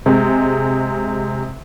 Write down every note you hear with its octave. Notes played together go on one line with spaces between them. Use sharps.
C3 G#3